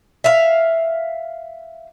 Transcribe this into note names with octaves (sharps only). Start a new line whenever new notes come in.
E5 F5